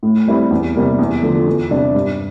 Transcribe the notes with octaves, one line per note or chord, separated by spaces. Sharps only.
A2
G3 C4 E4
E2
C3 G3 A#3
E2
D3 F3 A3
E2
C3 G3 D4
G2